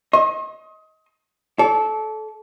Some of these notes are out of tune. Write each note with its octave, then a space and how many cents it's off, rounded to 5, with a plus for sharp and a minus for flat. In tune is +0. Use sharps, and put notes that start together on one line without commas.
D#5 +25 C6 +45
A4 -20 D5 -40